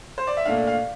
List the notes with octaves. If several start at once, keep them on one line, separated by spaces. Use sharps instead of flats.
C5
D5
E5
A#2 A3 D4 F5
F5